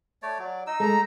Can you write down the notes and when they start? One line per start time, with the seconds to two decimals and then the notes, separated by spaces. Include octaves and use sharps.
0.22 A3 C#5 D5
0.39 F#3 D5
0.67 D#4 D#5 E6
0.80 G#3 A4 A#5